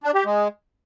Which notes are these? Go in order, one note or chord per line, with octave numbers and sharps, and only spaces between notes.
D4
G4
G#3